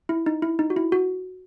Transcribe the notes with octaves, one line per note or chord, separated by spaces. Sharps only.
E4
D#4
E4
D#4
F#4
E4
F#4